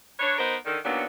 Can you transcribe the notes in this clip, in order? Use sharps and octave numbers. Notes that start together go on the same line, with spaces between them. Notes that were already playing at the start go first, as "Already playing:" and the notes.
D4 B4 C#5
B3 D#4 A#4 C5
D3 D#3
D#2 A#2 F#3 B3 D4